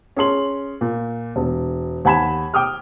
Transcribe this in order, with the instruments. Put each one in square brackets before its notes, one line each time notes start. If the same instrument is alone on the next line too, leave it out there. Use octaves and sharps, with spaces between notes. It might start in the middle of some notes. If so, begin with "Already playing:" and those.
[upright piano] C#4 G#4 C6 F#7
A#2
E1
D#2 F#5 G#5 B5 G#6 E7
G5 D6 D#6 F6